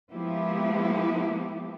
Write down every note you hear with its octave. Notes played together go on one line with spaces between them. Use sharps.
F3 G#3 A#3 B3 E4 G4